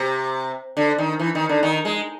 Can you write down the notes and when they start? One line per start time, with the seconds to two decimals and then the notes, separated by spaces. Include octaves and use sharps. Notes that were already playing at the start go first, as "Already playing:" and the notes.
Already playing: C3
0.77 D3
0.98 D#3
1.19 E3
1.35 D#3
1.49 D3
1.63 D#3
1.85 G#3